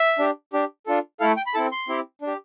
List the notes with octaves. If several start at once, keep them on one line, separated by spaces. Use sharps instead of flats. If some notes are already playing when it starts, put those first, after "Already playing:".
Already playing: E5
D4 G4
D4 G4
D4 F4 A4
A3 E4 A4 F5
G5
B5
C4 E4 A4 A5
C6
C4 E4 G4
D4
G4